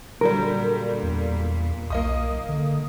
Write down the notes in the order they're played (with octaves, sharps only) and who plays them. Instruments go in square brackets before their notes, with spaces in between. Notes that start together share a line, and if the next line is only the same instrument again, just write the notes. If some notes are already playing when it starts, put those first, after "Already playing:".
[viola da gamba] A#2 [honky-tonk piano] D3 F#3 G3 [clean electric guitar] A#4
[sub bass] E2
[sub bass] B1 [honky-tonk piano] A#3 D#5 D#6
[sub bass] D3